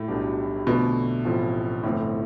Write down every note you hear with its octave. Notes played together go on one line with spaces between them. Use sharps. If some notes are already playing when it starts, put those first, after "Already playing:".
Already playing: A2
B1 B2 G3 D4 G4
F2 B2 D3 A3 D4
A1 A2 F3 C4
G1 F2 A2 E3 A3 C4